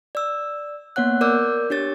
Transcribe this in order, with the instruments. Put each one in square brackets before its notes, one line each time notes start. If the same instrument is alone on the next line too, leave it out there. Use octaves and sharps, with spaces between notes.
[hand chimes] D5 E6
A#3 B3 C#5 F#5 F#6
A#4 D5 D6 E6 G6
D4 G4 C#5 A6